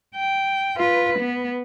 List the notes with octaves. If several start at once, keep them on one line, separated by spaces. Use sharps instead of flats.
G5
F4 B4
B3